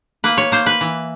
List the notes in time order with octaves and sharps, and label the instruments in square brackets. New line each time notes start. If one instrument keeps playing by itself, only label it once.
[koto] A#3 B4
C#5
A#3 C5
B4
E3